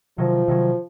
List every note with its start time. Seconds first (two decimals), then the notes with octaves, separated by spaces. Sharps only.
0.18 C3 D#3 F3 F#3
0.48 C3 D#3 F#3